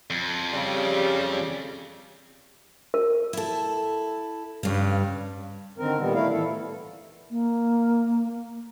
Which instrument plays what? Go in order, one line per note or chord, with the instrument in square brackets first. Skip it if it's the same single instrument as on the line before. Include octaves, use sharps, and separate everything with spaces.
[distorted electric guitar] F2
[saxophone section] C#3 G3
[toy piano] A#4
[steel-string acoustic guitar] E4 A4
[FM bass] G2 [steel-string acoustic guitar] C#3 F5
[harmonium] D3 D#3 C4 A#4
A#2 D#3 G3 B3
A3 E4 F5
A2 E3 A4
[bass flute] A#3